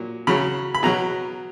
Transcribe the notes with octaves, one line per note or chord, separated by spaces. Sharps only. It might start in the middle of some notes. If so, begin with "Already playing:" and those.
Already playing: A#2 F#3
C#3 F#3 B5
B5
B2 F#3 A#5